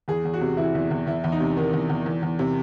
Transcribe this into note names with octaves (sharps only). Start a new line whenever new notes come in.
E2 G#4
E2
F#4
C3
E3 E4
E2
E2
E2 E4
E2
D#4
C3
D#3
E2
E2
E2
E2
C3